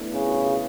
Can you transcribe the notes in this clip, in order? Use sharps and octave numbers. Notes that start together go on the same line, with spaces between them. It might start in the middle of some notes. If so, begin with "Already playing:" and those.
Already playing: A3 B3 D4 E4
C#3 B3
G#4
G#4